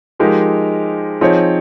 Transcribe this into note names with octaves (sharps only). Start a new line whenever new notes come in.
F3 G#3 D#4 G4 A#4
F3 C4 D#4 G#4 C#5